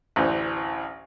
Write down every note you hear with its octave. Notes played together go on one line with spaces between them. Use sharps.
A1 D2 E3 C5